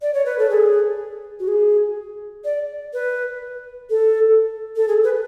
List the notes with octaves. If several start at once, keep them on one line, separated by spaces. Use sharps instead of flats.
D5
C#5
B4
A4
G#4
F#4
G#4
D5
B4
A4
A4
G#4
B4